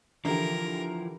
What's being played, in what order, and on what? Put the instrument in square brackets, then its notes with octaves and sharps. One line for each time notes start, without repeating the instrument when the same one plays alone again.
[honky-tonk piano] D3 E3 G4 [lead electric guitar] F3 E4 [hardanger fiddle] A#4